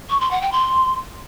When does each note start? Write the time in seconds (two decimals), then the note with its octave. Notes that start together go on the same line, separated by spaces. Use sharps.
0.10 C#6
0.21 C6
0.31 F#5
0.42 G5
0.52 C6